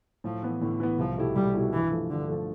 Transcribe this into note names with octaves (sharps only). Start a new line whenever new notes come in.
A2 F3
E3 B3
A2 D3
E3 B3
C2 F3
B2 A3 E4 G4
C2 G3
B2 A3 E4 G4
G2 E3
F3 A3
G2 D3
F3 A3